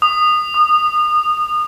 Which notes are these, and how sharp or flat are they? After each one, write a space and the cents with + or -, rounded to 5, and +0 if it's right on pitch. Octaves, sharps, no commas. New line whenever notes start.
D#6 -20
D#6 -30